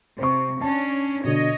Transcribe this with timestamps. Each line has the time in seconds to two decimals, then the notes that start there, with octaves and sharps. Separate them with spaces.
0.19 C3 C5 C#6
0.61 C#4 D4 A5
1.24 B2 D3 C#5 D#5